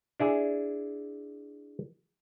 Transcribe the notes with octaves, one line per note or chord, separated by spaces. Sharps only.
D4 E4 G#4